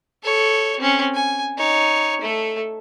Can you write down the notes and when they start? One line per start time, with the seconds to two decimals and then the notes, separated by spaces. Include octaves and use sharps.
0.23 A4 C#5
0.79 C4 C#4
1.15 G#5
1.58 D#4 C#5
2.21 A3 A4